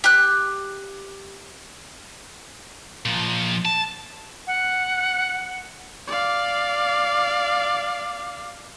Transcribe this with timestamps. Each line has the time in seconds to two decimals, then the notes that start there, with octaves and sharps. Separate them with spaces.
0.04 G4 F#6
3.05 A#2 F3
3.65 A5
4.47 F#5
6.08 D5 F5